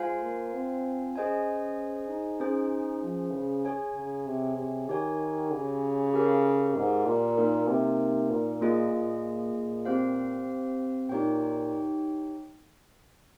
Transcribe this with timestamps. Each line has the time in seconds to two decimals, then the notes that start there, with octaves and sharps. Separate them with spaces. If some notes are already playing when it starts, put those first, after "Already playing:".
Already playing: G#3 F4 C5 F5 G#5
0.23 A#3
0.54 C4
1.16 C#4 G#4 C5 D#5 G#5
2.09 D#4
2.40 C#4 G#4 C5
3.03 F3
3.33 C#3
3.65 G#4 C#5 G#5
3.95 C#3
4.26 C3
4.58 C3
4.88 D#3 G4 C#5 G#5
5.51 C#3
6.13 G4 A#4 F5
6.76 G#2
7.06 A#2
7.38 A#3 D#4 A#4
7.68 C3
8.30 A#2
8.61 A#3 F4 G#4 D#5
8.92 A#2
9.54 A#2
9.85 C4 G4 C5 F5
11.09 A#2 D#4 G4 C#5 G5